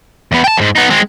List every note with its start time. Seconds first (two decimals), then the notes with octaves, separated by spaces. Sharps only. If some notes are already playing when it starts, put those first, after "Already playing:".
0.32 E2 B3
0.44 G5 A5
0.58 F2 G#2
0.76 B3 D#4
0.91 G#3 C4